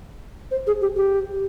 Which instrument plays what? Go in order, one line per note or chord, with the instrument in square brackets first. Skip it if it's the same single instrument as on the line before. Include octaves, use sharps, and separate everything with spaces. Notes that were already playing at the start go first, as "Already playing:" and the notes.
[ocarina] C5
G#4
G4
G4